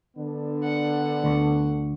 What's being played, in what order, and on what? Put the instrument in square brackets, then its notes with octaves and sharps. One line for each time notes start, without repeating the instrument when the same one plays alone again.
[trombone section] D3 B3 D4
[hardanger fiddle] F#5
[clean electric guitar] D2